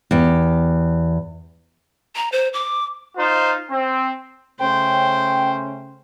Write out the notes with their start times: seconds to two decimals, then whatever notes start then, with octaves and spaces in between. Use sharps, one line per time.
0.11 E2 G4
2.16 A#5
2.32 C5
2.53 D6
3.16 D#4 F4 C5
3.70 C4
4.59 C#3 A3 C#4 C5 G5